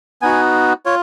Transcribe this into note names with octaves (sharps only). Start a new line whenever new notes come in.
B3 D#4 F#4 G#5
F4 C#5